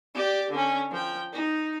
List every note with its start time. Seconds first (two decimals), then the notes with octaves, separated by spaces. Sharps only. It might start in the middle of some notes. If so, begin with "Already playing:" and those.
0.15 G4 D5
0.51 D3 C#4
0.91 F3 G5
1.33 D#4